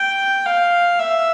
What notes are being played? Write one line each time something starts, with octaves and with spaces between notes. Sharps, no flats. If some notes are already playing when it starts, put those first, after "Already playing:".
Already playing: G5
F5
E5